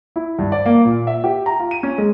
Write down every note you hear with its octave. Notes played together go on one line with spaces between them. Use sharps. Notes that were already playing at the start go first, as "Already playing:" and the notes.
E4
G2
D5
A#3
A#2
E5
G4
A#5
F4
D#7
C#4
G#3